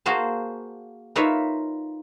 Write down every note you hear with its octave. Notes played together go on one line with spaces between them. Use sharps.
A#3 F#4 G#4 C5 A5
D#4 F4 A#4 B4 C#5 E5